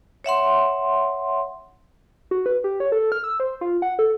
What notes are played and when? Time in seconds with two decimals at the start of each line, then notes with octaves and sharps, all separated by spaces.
0.24 C#5 E5 F#5 C6
2.31 F#4
2.46 B4
2.64 G4
2.80 C#5
2.92 A4
3.12 F6
3.24 E6
3.40 C5
3.61 F4
3.82 F#5
3.99 A4